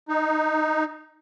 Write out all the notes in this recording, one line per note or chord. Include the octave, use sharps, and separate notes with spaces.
D#4